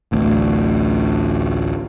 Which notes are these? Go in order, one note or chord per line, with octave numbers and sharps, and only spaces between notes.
A1 D2